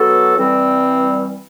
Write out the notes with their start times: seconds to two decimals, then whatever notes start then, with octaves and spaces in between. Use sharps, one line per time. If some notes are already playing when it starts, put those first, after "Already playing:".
Already playing: F#3 B3 F#4 A4
0.38 E3 G3 C4